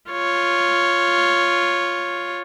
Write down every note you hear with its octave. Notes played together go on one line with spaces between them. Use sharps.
F4 C#5